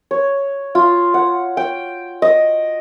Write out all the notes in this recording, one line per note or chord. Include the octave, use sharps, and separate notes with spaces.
C#5
F4
F#5
G5
D#5